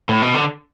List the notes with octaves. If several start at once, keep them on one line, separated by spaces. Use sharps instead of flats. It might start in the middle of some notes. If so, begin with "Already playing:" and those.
A2
B2
D3